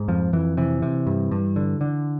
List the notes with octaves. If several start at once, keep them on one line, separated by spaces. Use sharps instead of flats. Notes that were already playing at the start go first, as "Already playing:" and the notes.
Already playing: G#2
F2 F3
F2 E3
C3 E3
C3
G2
G2
D3
D3